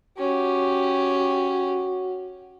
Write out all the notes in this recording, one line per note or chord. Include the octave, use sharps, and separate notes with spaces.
C#4 F#4 G4